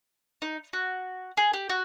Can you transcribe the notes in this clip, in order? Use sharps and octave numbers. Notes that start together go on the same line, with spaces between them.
D#4
F#4
G#4
G4
F#4